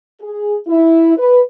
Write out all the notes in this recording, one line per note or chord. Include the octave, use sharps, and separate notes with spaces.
G#4
E4
B4